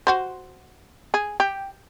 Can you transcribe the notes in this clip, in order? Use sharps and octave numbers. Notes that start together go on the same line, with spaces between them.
F#4 C5
G#4
G4